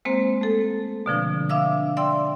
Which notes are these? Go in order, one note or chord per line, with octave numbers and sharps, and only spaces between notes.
G#3 A#3 C4 C5
A3 A4
B2 D3 F3 D4
D4 E5 F5 D6 E6
D5 E5 G5 C6 E6